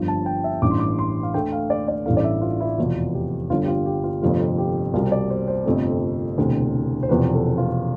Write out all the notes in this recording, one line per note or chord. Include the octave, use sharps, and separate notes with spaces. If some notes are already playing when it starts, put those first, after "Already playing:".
Already playing: G1 G2 F3
A5
G5
E5
A1 G2 E3 D6
C6
D6
C6
F5
D2 D3 A3 G5
F5
D5
D5
A1 G2 E3 A3 F5
D5
E5
F4
E4
F1 E2 B2 F4
G4
G1 G2 D3 F4
G4
F4
G4
F4
G1 F2 C3 F3 A3 F4
G4
C2 B2 G3 F4
C5
D5
C5
C5
G1 F2 C3 F3 A3
E1 D2 C3 E3
C5
E1 E2 C3 F3 B4
A4
F4